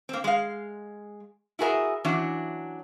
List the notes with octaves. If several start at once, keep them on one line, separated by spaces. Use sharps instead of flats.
A#3 C4
G#3 F5
E4 F#4 G#4 A#4 E5
E3 F#3 C#4 D4